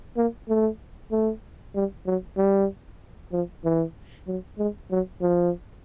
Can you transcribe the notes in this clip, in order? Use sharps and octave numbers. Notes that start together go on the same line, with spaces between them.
A#3
A3
A3
G3
F#3
G3
F3
E3
F#3
G#3
F#3
F3